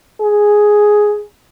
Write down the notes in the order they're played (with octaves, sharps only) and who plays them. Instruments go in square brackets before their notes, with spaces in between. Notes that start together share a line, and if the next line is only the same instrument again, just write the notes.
[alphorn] G#4